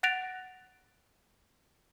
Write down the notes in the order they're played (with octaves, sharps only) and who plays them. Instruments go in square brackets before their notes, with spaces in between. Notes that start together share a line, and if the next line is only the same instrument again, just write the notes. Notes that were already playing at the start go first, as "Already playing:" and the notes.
[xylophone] F#5 F#6 A6 A#6 D7 F7